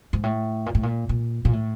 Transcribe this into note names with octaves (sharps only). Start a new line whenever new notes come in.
G#2
A2
A#2
A2
A#2
A#2
A#2
A2